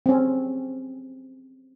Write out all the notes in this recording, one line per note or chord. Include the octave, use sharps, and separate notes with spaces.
C4 C#4